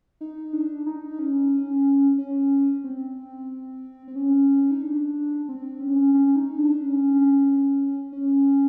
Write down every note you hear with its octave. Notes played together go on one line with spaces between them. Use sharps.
D#4
D4
D#4
C#4
C#4
C4
C4
C#4
D#4
D4
C4
C#4
C#4
D#4
D4
C#4
C#4